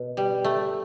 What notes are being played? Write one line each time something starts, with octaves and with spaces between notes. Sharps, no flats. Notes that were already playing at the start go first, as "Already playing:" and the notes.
Already playing: B2
G3
A3